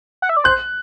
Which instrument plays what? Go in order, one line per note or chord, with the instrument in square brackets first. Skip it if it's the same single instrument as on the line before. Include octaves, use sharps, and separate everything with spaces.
[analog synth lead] F#5
E5
D5
[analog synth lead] C5 [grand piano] F#6